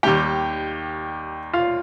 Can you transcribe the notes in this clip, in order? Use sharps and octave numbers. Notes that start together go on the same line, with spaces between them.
D#2 D#3 G3 G4 G5
F4 F5